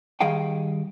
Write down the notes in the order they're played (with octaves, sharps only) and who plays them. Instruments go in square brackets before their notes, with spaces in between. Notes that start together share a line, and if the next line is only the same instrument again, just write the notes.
[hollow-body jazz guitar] D#3 G3 G#4 D#5 F5 G5